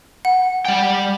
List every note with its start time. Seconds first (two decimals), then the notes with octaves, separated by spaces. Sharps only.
0.25 F#5
0.65 G3 G5